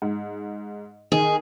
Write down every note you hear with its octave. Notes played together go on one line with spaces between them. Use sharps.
G#2
D#3 G#4